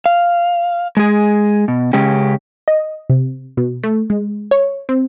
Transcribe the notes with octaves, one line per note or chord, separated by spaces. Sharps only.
F5
G#3 G#4
B2
C#3 G#3 C#4 G4
D#5
C3
B2
A3
G#3
C#5
C4